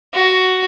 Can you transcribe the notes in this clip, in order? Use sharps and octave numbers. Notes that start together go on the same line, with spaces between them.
F#4